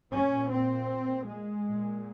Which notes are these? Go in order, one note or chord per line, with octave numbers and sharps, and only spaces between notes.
A#2 C#4
C4
G#3
A#2